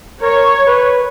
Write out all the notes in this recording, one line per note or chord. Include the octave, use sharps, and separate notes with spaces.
A#4 C#5
B4